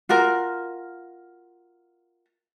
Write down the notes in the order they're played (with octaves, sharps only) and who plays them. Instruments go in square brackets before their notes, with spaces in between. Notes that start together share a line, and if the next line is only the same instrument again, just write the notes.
[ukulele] F4 F#4 A#4